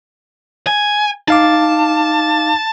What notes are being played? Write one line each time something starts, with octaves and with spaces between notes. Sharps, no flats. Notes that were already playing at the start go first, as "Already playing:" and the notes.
G#5
D#4 F5 A5 D6